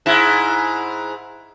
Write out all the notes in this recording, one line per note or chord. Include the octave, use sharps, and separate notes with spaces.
G#2 E4